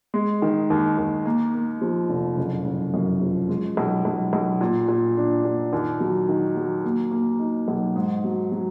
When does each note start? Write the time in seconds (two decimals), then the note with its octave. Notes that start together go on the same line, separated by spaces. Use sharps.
0.14 G#3
0.42 D#3
0.70 D#2
0.98 D#2
1.26 A#3
1.54 A#3
1.82 F3
2.09 F1
2.37 F#1
2.65 F#1
2.94 F#2
3.21 F3
3.49 G#3
3.77 B1
4.05 B1
4.33 B1
4.61 A#2
4.88 A#2
5.17 D4
5.45 A#2
5.73 D#2
6.00 F#3
6.29 D#3
6.56 F#3
6.84 A#3
7.11 A#3
7.39 D#4
7.68 B1
7.96 G#2
8.24 F#3
8.52 F#3